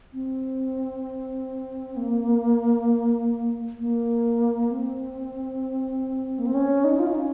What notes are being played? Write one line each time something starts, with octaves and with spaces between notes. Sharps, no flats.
C4
A#3
A#3
C4
A#3
C4
C#4
D#4
F4
D#4
C#4